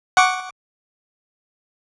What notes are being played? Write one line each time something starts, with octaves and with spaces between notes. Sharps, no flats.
F#5 C#6 D6